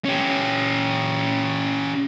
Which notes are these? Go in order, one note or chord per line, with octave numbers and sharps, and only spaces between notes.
C#4 G4